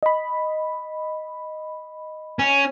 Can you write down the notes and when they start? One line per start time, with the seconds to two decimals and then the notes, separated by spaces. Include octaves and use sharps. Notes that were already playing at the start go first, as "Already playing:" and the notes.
0.03 D#5 B5
2.39 C#4